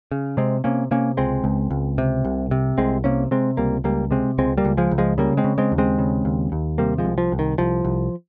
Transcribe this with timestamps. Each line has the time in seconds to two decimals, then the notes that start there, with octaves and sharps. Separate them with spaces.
0.12 C#3
0.37 C3 G#3 C4
0.64 C3 A#3 C#4
0.91 C3 A#3 C#4
1.17 C#2 G#3 C4
1.44 C#2
1.71 C#2
1.98 C3
2.24 C2
2.51 C3
2.78 C2 G#3 C4
3.04 C3 A#3 C#4
3.31 C3 G#3 C4
3.57 C#2 G3 A#3
3.84 C#2 G3 A#3
4.11 C3 G#3 C4
4.38 C#2 G#3 C4
4.58 G3 A#3
4.65 C#2
4.77 F3 G#3
4.91 C#2
4.98 F3 G#3
5.18 C#3 G3 A#3
5.37 G#3 C4
5.44 C#3
5.58 G#3 C4
5.72 D#2
5.78 G#3 C4
5.99 C#3
6.25 D#2
6.52 D#2
6.78 C3 G3 A#3
6.98 F3 G#3
7.05 C2
7.18 F3
7.32 C2
7.39 D#3
7.58 C2 F3
7.85 C2